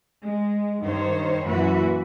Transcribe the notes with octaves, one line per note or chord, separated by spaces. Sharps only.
G#3
G2 D#3 C5 C#5
F#2 A#2 E3 E4 F#4 B4